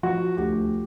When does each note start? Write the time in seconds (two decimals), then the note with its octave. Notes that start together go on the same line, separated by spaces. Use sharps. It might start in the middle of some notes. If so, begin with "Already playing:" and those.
0.03 F3 F#4
0.37 D2 G4